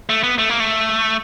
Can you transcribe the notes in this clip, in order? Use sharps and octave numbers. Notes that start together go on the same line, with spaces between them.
A3
B3
A3
A#3
A3